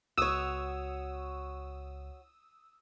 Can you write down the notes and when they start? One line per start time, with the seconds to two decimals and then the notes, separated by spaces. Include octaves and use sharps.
0.18 C#2 F#4 C#5 D#6 E6